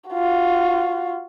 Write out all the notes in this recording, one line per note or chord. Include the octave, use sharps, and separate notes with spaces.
F4 F#4